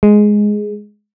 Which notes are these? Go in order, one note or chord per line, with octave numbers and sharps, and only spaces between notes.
G#3